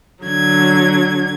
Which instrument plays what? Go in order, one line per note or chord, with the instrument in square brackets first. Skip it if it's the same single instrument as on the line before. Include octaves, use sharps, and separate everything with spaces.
[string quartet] D3 F#3 G#6